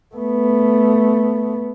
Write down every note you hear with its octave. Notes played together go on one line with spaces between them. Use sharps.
A3 B3